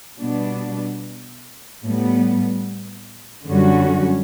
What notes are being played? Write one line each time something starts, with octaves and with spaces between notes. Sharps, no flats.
B2 G3 B3 D4
A2 G3 B3
F#2 D3 G3 C#4 F#4